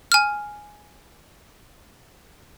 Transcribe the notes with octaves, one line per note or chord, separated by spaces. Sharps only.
G#5 F6